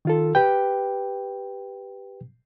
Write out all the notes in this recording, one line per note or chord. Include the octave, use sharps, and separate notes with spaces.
D#3 F4 A4
G4 B4 G5